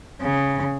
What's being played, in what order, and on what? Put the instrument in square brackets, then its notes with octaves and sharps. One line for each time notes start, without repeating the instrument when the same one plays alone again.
[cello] C#3